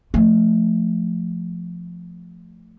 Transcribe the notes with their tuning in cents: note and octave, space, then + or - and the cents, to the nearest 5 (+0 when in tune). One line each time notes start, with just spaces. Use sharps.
F3 +0 A3 +0